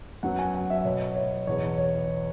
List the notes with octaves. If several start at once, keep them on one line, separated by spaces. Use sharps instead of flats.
F#2 F#3 B3 F#5
G#5
F#5
E5
B2 B3 C#5
C#5
E2 B2 B3 C#5
C#5